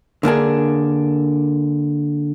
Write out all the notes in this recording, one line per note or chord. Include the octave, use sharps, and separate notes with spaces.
D3 A#3 D4 G#4